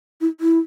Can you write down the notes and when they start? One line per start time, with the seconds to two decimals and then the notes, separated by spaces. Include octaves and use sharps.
0.21 E4
0.40 E4